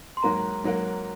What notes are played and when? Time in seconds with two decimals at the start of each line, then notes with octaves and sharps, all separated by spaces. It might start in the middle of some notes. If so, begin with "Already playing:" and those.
0.17 C6
0.23 G#2 F#3 A#3 A#5
0.64 G#2 F#3 A#3